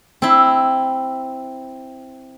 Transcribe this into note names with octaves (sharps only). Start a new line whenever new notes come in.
C4 E4